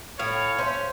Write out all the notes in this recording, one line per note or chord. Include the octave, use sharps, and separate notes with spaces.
A2 C#5 F5
C#4 C5 E5